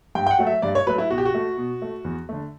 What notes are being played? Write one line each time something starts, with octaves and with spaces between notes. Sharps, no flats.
G2 G5
G5
F#5
F#3 A3
E5
G2 D5
C#5
F#3 A3 B4
E4
B2 F#4
G4
F#4
A3
B2
A3
E2
D3 A3